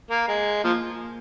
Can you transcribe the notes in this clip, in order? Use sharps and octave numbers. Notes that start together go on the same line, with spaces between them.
A#3
G#3
F3 A#3